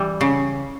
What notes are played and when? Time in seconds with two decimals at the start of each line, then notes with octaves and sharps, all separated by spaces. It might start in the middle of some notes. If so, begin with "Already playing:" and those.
Already playing: E3 G3
0.21 C#3